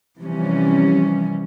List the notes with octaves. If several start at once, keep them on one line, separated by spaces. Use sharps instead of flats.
C3 E3 F3 G3 C#4